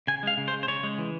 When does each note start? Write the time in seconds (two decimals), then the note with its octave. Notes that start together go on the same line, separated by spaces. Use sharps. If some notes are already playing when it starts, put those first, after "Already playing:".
0.07 C#3 G#5
0.23 G#3 F5
0.38 C#3
0.48 C5
0.53 G#3
0.63 C5
0.68 C#3 C#5
0.83 G#3
0.98 E3